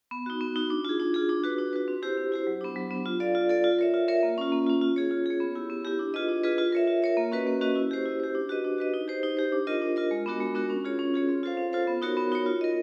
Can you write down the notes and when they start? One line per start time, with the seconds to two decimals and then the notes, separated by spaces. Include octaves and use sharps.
0.11 B3
0.26 D#4 F#4
0.41 B3
0.56 D#4 F#4
0.70 D4
0.85 F4 G#4
1.00 D4
1.14 F4 G#4
1.29 D4
1.43 F#4 B4
1.58 D4
1.73 F#4 B4
1.88 C4
2.02 E4 G4 C5
2.17 C4
2.32 E4 G4 C5
2.47 F#3
2.61 B3 D4
2.76 F#3
2.91 B3 D4
3.06 F4
3.20 A4 D5 F5
3.35 F4
3.49 A4 D5 F5
3.64 F4
3.79 A#4 C#5 E5
3.94 F4
4.08 A#4 C#5 E5
4.23 A#3
4.38 C#4 F4
4.52 A#3
4.67 C#4 F4
4.82 F4
4.96 G#4 C#5
5.11 F4
5.26 G#4 C#5
5.40 B3
5.55 E4 G4
5.70 B3
5.85 E4 G4
5.99 D4
6.14 F4 G#4 B4 D#5
6.29 D4
6.43 F4 G#4 B4 D#5
6.58 F4
6.72 A#4 C#5 E5
6.87 F4
7.02 A#4 C#5 E5
7.17 A#3
7.32 C#4 F#4 B4 D#5
7.47 A#3
7.61 C#4 F#4 B4 D#5
7.76 E4
7.91 G4 C5
8.05 E4
8.20 G4 C5
8.35 D4
8.49 F#4 B4 D#5
8.64 D4
8.78 F#4 B4 D#5
8.94 D#4
9.08 G4 C5
9.23 D#4
9.37 G4 C5
9.52 D4
9.67 F4 A#4 D#5
9.82 D4
9.96 F4 A#4 D#5
10.11 G#3
10.26 B3 D4 F#4 A#4
10.40 G#3
10.55 B3 D4 F#4 A#4
10.70 C#4
10.85 F4 G#4 C#5
10.99 C#4
11.14 F4 G#4 C#5
11.29 C4
11.43 F4 A4 C5 F5
11.57 C4
11.72 F4 A4 C5 F5
11.87 B3
12.02 D#4 F#4 A#4 C#5
12.17 B3
12.32 D#4 F#4 A#4 C#5
12.46 F4
12.61 A#4 D#5